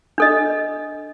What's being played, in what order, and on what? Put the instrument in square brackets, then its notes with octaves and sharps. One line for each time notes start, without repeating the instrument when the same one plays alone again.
[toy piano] D4 A4 D#5